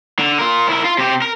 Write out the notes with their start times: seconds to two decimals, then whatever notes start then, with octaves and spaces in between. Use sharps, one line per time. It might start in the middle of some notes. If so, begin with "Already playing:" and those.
0.19 D3
0.39 F4 A#4
0.69 E4 A#4
0.85 F4
0.98 C3 G4
1.22 A#4